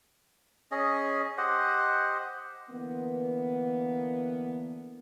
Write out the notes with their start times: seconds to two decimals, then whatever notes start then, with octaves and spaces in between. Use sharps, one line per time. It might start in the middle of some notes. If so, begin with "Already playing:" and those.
0.71 C#4 G#4 D#5
1.38 G4 C5 D#5 F#5
2.70 D3 E3 A#3 B3